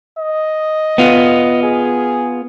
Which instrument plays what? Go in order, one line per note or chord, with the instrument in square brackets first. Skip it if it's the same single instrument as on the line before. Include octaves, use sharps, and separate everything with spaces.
[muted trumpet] D#5
[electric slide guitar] B3 F4
[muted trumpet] G#4